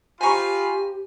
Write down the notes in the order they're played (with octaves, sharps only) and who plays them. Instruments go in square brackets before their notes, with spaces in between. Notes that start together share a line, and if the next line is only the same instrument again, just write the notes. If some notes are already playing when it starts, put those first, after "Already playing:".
[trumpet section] F4 B5 [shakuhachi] G4 [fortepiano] C5 A#5 C#6 [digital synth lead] G#5